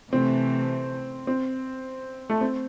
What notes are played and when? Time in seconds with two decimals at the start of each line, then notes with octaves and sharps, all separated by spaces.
0.12 C3 E3 A3 C4
1.27 C4
2.30 A3
2.41 C4